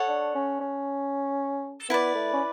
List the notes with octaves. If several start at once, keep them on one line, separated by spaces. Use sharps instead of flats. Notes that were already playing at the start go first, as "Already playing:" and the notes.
Already playing: A4 C#5 F#5 C#6
D4
C#4
C#4
B3 E4 B4 D5
A3
C#4